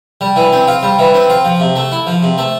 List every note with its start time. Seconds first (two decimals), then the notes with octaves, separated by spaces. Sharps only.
0.21 G3
0.36 E3
0.52 C4
0.68 F4
0.83 G3
0.99 E3
1.14 C4
1.30 F4
1.45 F3
1.60 C3
1.76 A3
1.92 E4
2.07 F3
2.23 C3
2.38 A3